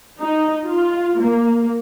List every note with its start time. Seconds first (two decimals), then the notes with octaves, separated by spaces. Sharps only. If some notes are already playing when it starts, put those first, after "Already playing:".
0.20 D#4
0.66 F4
1.22 A#3